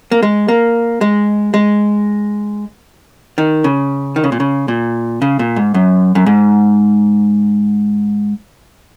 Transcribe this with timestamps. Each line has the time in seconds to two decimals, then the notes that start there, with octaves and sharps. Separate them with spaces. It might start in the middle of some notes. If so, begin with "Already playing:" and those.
0.11 A#3
0.23 G#3
0.48 A#3
1.01 G#3
1.54 G#3
3.38 D#3
3.64 C#3
4.16 D#3
4.24 C#3
4.32 A#2
4.40 C#3
4.68 A#2
5.22 C#3
5.39 A#2
5.56 G#2
5.74 F#2
6.15 F#2
6.26 G#2